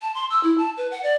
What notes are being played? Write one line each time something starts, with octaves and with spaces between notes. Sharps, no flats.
A5
C6
E6
E4
A5
B4
F#5
D5